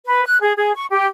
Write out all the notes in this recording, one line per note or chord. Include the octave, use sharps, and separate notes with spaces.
B4
F#6
G#4
G#4
C#6
G4